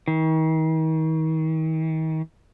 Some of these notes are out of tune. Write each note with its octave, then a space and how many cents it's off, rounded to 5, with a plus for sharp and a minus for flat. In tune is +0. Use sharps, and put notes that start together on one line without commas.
D#3 +40